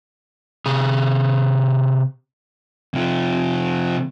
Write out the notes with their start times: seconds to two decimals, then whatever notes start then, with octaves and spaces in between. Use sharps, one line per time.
0.66 C3 G#4
2.94 C3 F3